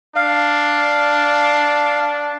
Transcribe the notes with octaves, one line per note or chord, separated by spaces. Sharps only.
D4 F5